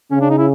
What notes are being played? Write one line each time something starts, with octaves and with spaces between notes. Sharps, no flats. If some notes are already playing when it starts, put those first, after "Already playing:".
C#3 C#4
D4
D#4
E4